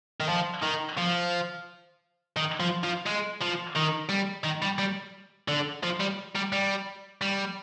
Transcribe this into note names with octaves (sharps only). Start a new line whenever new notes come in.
D#3
F3
D#3
F3
D#3
F3
F3
G#3
F3
D#3
G3
D#3
G3
G3
D3
F3
G3
G3
G3
G3